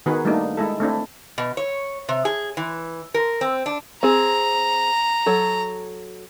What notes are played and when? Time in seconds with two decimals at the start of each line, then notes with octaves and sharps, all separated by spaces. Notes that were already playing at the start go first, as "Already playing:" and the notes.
0.06 D#3 B3 F#4 G#4 B4
0.25 G3 A3 A#3 D4 D#4
0.57 G#3 E4 A4
0.80 A3 C4 D4 E4
1.38 B2
1.57 C#5
2.09 C3
2.25 G#4
2.57 E3
3.14 A#4
3.41 C4
3.66 D4
4.03 C4 G#4 A#5
5.26 F#3 A4